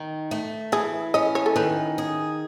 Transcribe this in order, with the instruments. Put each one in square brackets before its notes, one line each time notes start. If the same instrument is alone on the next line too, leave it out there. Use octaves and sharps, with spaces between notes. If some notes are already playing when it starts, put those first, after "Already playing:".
Already playing: [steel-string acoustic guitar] D#3
A3
[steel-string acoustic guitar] E3 [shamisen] G#4
[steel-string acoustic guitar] C#4 [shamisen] D#5
[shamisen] C#5
A4
[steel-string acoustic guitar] D#3 [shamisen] B4
[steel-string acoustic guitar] G#4